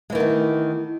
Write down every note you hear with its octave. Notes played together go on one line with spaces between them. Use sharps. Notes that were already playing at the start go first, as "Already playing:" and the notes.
D#3 E3 G#3 A3 B3